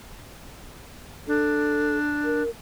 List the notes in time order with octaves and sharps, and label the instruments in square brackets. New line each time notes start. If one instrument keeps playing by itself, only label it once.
[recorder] D4 [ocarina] A4
[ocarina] A#4